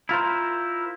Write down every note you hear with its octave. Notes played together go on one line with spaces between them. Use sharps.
E4 F4 A#4 C5